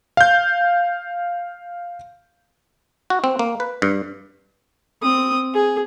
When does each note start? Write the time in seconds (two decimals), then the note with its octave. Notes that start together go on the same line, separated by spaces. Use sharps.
0.17 F5 G6
3.10 F#4
3.24 C4
3.39 A#3
3.60 B4
3.82 G2
5.02 C4 D#6
5.54 G#4